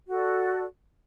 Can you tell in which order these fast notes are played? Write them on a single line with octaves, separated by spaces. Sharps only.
F#4 A4 D5